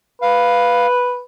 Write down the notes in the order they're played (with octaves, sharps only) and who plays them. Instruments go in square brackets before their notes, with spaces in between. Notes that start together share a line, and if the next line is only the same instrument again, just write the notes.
[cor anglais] B4 [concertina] F5